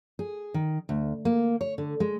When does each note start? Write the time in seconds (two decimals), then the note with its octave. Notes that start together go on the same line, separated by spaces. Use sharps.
0.19 G#4
0.54 D#3
0.89 D2
1.25 A#3
1.61 C#5
1.78 D3
2.00 G#3